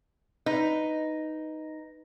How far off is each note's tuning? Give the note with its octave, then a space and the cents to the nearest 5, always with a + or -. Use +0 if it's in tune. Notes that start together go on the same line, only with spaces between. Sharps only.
D#4 +0 B4 +0